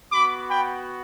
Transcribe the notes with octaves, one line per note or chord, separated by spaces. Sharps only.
B3 F#4 B5 D6
G5 B5